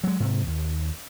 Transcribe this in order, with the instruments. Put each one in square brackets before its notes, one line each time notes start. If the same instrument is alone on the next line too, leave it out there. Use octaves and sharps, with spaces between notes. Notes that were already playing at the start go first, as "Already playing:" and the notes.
[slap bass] F#3 G#3
G#2 C3
D#2